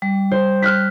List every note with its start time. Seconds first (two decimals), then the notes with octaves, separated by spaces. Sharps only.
0.02 G3
0.31 C5
0.62 F6 F#6 B6